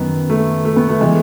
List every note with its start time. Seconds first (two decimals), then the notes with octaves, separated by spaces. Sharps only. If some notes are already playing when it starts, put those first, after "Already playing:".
Already playing: F#2 D#3 B3
0.30 A3
0.65 A3
0.76 B3
0.89 A3
1.01 E3 G#3